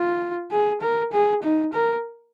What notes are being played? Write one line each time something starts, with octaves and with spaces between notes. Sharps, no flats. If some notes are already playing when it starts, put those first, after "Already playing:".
Already playing: F4
G#4
A#4
G#4
D#4
A#4